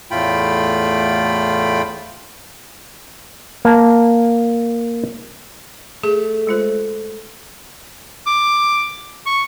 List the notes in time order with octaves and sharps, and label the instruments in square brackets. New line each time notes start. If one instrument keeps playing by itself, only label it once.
[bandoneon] E2 A2 A3 F4 G5 B5
[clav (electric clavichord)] A#3 A5
[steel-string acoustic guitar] A3 [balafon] G#4
[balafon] G#3 F4 C5
[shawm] D6
C#6